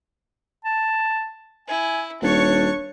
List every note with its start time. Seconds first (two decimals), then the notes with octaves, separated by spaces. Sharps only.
0.65 A5
1.68 E4 G#5
2.22 D#1 D4 C#5 C#6